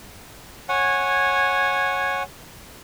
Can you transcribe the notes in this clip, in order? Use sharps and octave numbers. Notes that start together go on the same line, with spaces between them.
C#5 F#5 G#5